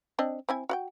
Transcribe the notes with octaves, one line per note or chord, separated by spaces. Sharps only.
C4 D4 D#5
C4 E4 G#5
F#4 F#5 G5